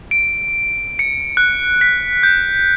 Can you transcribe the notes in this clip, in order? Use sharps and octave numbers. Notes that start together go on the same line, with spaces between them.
D7
C#7
F#6
B6
G6